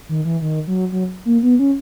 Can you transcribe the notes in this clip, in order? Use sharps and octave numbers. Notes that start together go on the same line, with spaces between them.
D#3
E3
D#3
F#3
F#3
A#3
B3
C#4